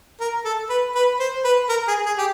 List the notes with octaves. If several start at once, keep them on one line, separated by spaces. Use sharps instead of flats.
A#4
A4
B4
B4
C5
B4
A#4
G#4
G#4
G4